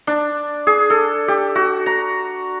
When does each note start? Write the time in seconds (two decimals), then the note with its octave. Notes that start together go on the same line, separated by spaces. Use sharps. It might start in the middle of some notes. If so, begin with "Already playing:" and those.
0.07 D4
0.67 G#4
0.90 A4
1.28 G4
1.55 F#4
1.86 A#5